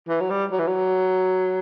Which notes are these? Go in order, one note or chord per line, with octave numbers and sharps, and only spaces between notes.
E3
F#3
G3
F#3
E3
F#3